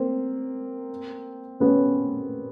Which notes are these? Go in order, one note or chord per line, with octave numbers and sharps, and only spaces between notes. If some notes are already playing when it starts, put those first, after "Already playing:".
Already playing: A#3 C4
B3 C#4